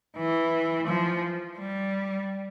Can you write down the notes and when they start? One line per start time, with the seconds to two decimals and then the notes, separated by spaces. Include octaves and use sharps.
0.17 E3
0.88 F3
1.58 G3